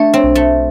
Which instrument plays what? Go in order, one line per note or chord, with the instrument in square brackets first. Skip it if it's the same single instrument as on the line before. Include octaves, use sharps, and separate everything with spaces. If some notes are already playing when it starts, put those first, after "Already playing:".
Already playing: [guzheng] A3 [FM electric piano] D4
[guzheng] C4
[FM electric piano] B1
[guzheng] A3